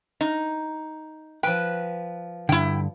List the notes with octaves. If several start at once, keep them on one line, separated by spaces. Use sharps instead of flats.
D#4
F3 B4 G5
G2 D3 E4 G5